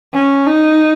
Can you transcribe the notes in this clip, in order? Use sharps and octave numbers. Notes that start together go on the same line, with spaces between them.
C#4
D#4